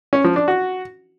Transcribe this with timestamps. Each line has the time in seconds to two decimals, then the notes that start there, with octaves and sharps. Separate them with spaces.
0.13 C#4
0.24 F3
0.36 D4
0.48 F#4